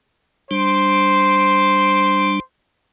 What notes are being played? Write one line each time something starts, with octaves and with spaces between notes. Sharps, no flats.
G3 D4 C5